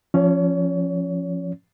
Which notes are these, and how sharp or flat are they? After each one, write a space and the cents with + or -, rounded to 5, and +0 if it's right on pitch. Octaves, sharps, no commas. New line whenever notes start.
F3 +0 C#4 -10 C#5 +35